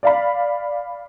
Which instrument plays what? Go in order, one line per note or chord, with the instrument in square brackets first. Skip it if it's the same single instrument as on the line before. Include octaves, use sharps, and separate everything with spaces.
[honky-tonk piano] D5 F5 B5